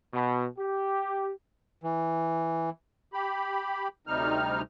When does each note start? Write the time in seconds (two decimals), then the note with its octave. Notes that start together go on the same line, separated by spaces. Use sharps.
0.14 B2
0.58 G4
1.83 E3
3.13 G4 B5
4.07 D2 C3 G3 D#4 F6